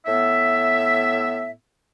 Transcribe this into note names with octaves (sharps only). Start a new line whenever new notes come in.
A2 B3 E5